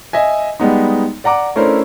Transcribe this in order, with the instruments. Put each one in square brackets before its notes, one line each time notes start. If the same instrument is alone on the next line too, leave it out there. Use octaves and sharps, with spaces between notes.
[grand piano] D#5 E5 G#5
G3 G#3 B3 D#4
D5 F#5 A#5 D6
A3 C#4 D4 E4 A#4 C5